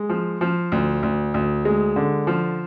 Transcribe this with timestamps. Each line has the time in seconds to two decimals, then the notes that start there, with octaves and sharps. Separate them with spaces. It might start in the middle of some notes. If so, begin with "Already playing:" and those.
Already playing: G#3
0.09 F3
0.41 F3
0.72 D2
1.03 D2
1.34 D2
1.65 G#3
1.96 D3
2.27 F3